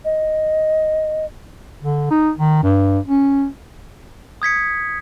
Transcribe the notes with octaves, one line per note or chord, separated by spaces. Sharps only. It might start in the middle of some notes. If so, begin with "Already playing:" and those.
D#5
D3
D#4
D#3
G2
C#4
D#6 G#6 B6 C#7